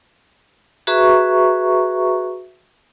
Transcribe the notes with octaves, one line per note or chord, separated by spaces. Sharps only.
F#4 G#4 B4 E5 A#5 C#6